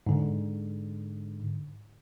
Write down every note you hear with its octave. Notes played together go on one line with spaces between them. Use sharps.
G#2 D3